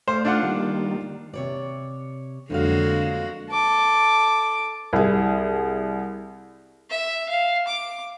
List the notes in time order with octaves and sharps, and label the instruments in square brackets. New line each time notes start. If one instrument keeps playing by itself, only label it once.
[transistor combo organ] A3 D5 F5 [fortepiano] C5
[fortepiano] D4 F4 F#5
[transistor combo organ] D#3 G3 A#3
[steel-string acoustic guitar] C3 C#5 D5
[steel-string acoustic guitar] F2 F#3 F5 [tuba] D3 [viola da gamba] G#3 A#3 F#4
[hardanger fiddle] A4 D6
[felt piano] C2 G#4
[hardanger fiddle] E5
F5
D6